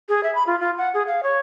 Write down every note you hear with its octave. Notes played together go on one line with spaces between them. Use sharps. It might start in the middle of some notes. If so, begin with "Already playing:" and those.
G#4
E5
B5
F4
F4
F#5
G#4
F5
C#5